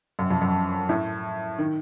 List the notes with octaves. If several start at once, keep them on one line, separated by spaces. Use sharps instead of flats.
F#2
F2
F#2
A2
D#3